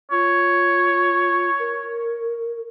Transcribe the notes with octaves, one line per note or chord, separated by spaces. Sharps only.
F4 C#5
A#4